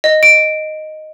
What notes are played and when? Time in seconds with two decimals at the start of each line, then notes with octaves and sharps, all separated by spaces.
0.04 D#5
0.23 D7